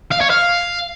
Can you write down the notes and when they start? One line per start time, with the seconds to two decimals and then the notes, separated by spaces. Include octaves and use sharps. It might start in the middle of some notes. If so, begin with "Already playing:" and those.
0.12 F5
0.21 C#5
0.30 F5